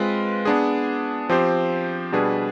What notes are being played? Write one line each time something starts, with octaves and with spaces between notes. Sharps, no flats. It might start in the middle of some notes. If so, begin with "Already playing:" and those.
Already playing: G#3 C4 F4 B4
B3 D4 G#4
F3 C4 G4 C5
B2 G3 D4 G#4 B4